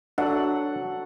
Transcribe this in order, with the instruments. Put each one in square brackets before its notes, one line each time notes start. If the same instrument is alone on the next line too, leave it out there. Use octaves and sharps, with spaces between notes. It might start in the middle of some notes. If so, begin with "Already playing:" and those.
[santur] F#3 A4 [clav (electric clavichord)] D4 [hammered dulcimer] F#5